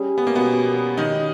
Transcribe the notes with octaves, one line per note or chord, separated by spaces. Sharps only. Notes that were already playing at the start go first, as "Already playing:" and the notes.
Already playing: G3 C#4 G#4
B3
A#3
B2 B3
D#3 D#4